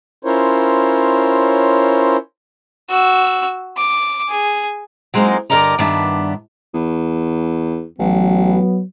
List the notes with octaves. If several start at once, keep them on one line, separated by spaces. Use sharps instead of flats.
C#4 E4 F4 A#4 C5 C#5
F#4 E6
D6
G#4
F#3 G#3 A#3 C4 D#4
G2 D3 A#4 D5 D#5 A#5
G2 D#3 B3 D4 E5
E2
A1 F#3 B3